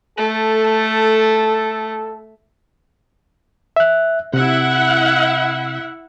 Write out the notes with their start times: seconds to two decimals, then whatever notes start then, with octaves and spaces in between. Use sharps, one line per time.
0.18 A3 A4
3.76 E5 F#6
4.34 C3 E4 E5 F#5